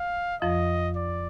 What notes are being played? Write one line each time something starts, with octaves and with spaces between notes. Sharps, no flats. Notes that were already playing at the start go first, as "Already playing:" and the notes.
Already playing: F5
F2 F3 D#5
D5